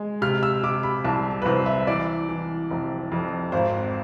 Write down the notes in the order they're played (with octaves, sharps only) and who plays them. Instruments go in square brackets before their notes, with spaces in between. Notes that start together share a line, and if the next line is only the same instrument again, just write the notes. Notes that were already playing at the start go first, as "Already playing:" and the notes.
Already playing: [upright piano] G#3
C3 F6
E6
C3 D6
B5
C2 A5
B4
C2 C5
E5
E3 D5
E3
F1
F2
G#1 C5